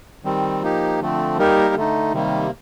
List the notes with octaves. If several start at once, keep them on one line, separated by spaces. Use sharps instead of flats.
D#3 G3 C4
F3 A#3 D#4 G4
D3 F3 A3 C4
G3 A#3 D#4 G4 A#4
D3 A3 D#4
C3 D#3 G3 A#3